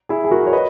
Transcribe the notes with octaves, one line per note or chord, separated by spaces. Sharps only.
E4 G#4
G#4
F#4 A#4
C#5
B4 D#5